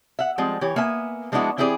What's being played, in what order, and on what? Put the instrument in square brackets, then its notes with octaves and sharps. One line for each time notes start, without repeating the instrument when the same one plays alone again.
[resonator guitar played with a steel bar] E5 F#5
F3 G3 G#3 C4
E3 G4 C#5
A#3 B3 E5 G#5
F3 G#3 B3 D4 E4 F#4
E3 C4 E4 G4 G#4 D5